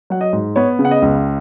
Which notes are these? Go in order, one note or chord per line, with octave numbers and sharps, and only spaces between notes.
F#3 F#5
D#5
G#2
B3 C#5
C#3
F#5
D#5
C#2